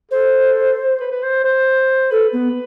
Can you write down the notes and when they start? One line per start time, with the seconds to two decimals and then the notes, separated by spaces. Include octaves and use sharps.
0.11 A4 C5
1.00 B4
1.12 B4
1.23 C5
1.44 C5
2.11 A4 B4
2.33 B3